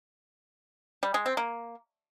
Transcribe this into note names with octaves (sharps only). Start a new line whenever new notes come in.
G3
G#3
C4
A#3